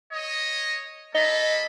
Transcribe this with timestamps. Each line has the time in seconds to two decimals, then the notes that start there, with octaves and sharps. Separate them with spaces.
0.13 C#5 D#5
1.15 A#3 A4 D#5 B5